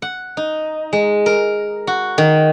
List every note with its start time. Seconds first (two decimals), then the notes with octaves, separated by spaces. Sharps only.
0.02 F#5
0.37 D#4
0.93 G#3
1.26 A#4
1.87 F#4
2.18 D#3